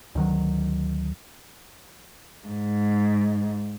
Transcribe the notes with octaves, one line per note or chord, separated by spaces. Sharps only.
D2 D#3 F#3
G#2